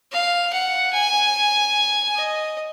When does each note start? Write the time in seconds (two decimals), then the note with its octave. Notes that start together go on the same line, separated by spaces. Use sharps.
0.12 F5
0.53 F#5
0.93 G#5
2.15 D#5